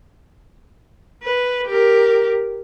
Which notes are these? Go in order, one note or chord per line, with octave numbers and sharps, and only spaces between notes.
B4
G4 A#4